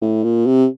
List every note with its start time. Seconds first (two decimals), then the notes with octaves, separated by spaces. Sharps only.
0.02 A2
0.24 A#2
0.46 C3